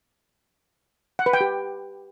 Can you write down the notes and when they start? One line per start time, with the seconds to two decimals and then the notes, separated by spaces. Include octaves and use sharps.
1.19 F#5
1.26 B4
1.33 G5
1.41 G4